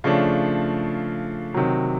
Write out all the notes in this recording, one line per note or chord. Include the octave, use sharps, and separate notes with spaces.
C#3 F3 A3 D4
C3 D#3 F#3